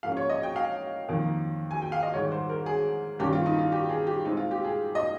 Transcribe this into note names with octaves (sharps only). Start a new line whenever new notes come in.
G#2 F3 A#3 C#4 F5
C#5
D#5
G5
F5
F2 D#3 A#3
G#5
G5
F5
D#5
G#2 D#3 G3 C#5
C5
A#4
G#4
G2 D#3 A#3 C#4 G4
F4
D#4
F4
G4
G#4
G4
A#2 G#3 C4 D#4
F4
G4
G#4
D#5